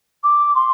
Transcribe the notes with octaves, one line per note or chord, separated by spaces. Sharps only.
D6
C6